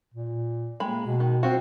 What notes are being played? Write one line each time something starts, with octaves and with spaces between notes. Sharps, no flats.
A#2
G#3 A#3 B5
B2
D#3
C4 F4 F#4